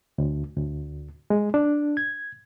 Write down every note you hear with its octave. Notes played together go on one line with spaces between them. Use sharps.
D2
D2
G#3
D4
G#6